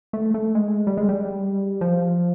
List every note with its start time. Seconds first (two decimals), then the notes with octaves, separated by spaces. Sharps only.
0.13 A3
0.34 A3
0.55 G#3
0.87 G3
0.97 G#3
1.09 G3
1.81 F3